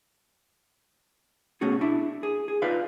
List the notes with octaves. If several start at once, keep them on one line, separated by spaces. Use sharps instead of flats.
B2 A3 C#4 F#4 G#4
D4 E4
G#4
G#4
D#4 F4 B4 D5 F5